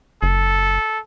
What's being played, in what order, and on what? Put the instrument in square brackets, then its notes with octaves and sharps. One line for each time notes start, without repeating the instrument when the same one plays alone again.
[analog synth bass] F#1 [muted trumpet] A4